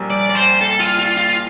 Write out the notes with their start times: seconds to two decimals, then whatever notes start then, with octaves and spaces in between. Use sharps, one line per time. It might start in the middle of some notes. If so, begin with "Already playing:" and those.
Already playing: A#1 G3 A#3
0.10 D5
0.29 D5
0.35 C5
0.61 A4
0.79 F4
0.99 F4
1.17 F4